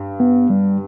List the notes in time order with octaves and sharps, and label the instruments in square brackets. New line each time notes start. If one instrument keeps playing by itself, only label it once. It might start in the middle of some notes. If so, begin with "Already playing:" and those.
Already playing: [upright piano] G2
[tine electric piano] B3
G3